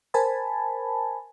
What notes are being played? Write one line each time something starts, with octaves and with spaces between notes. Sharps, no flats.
A#4 C5 G#5 A5 B5